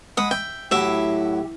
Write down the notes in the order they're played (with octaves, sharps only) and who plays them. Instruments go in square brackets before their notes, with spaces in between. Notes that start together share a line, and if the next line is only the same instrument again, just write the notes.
[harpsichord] G#3 B5 [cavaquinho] F#5 D#6
[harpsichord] E5 [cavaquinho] G5
[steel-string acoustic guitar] A2 [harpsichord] F#3 E4 [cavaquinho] G4 E5